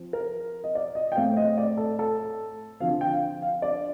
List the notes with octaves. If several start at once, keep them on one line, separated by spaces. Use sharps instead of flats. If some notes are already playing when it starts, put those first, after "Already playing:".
Already playing: F3 C4
A#4
D#5
D5
D#5
G5
A2 A3 C4 F5
D#5
D5
A4
A4
D3 F3 C4 F5
G5
F5
F5
D5